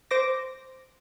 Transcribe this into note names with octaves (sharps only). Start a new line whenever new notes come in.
C5 D6 A#6